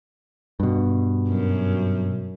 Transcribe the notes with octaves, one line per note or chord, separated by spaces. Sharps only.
G2 B2
F#2